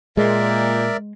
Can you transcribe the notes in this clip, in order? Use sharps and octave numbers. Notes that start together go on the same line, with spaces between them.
A#2 G#3 A#4 D5 E5